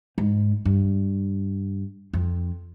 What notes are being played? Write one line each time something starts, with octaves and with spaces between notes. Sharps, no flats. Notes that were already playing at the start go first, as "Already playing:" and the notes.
G#2
G2
F2